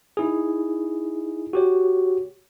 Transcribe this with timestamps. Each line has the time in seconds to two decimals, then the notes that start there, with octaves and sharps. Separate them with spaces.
0.17 D#4 E4 G#4
1.53 F#4 G4 C#5